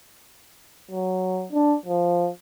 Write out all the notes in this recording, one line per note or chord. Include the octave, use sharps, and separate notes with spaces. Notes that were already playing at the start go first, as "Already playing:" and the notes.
F#3
D4
F3